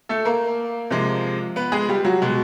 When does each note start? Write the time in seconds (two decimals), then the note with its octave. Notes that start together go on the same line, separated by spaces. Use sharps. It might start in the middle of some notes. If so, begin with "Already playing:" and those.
0.09 A3 A4
0.25 A#3 A#4
0.90 C3 F3 G#3
1.56 B3 B4
1.72 G#3 G#4
1.89 G3 G4
2.05 F#3 F#4
2.22 B2 G#3